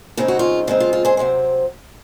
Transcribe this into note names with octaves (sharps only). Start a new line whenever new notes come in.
C#3 G#3 C4 D#4 F4
F#4
F4
C#3 G#3 C4 D#4 F4
F4
F4
G#4 C5
C3 F#3 C4 C5